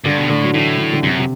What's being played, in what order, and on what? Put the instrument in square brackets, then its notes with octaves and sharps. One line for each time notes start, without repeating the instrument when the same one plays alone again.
[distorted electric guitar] G2 [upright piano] D3
[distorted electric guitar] B2
[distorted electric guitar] A2 [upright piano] D3
[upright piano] F#3
[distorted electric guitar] A2 [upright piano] E3
[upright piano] D3
D3
[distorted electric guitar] F#2 [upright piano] C3
[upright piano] C3